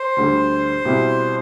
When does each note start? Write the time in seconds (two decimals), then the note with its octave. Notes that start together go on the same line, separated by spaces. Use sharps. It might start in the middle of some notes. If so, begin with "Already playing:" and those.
Already playing: C5
0.17 D2 D3 G3
0.85 B2 G3 C4 E4 G4